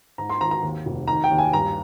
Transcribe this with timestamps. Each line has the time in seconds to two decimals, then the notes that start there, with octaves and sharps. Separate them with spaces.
0.18 G#2 A#5
0.29 C6
0.40 G#1 A#5
0.51 A#5
0.62 D#2
0.86 F1
1.07 D#3 A#5
1.24 G5
1.31 D#2
1.38 G#5
1.53 G2 A#5